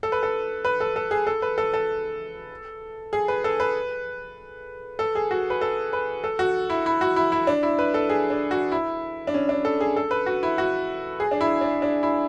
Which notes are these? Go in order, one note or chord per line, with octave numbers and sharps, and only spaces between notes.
A4
B4
A4
B4
A4
A4
G#4
A4
B4
A4
A4
G#4
B4
A4
B4
A4
G#4
F#4
B4
A4
B4
A4
F#4
E4
E4
F#4
E4
E4
D4
E4
B4
A4
G#4
D4
F#4
E4
D4
C#4
D4
A4
G#4
A4
B4
F#4
E4
F#4
G#4
D4
E4
D4
D4
E4